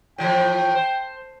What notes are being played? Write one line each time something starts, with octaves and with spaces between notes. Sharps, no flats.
A2 E3 F3 G5
C5